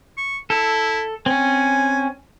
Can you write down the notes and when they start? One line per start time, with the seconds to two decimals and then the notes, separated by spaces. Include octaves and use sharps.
0.17 C#6
0.50 E4 A4
1.26 C4 C#4 G#5